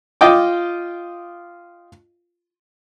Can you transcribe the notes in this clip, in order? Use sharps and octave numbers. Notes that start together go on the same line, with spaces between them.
F4 D#5 G5 D6